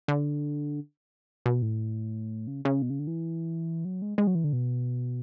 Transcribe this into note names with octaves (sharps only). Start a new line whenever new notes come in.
D3
B2
A2
C#3
C#3
B2
C#3
D3
E3
F#3
G#3
G#3
F#3
E3
D3
B2